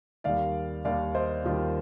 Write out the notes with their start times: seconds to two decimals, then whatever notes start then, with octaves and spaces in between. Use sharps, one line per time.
0.24 D#2 D#3 G3 D5 F5
0.85 D#2 D#3 G3 D5 F5
1.15 C5 D#5
1.44 D#2 D#3 G3 F4